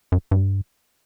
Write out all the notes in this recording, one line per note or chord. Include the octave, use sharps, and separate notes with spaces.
F#2
G2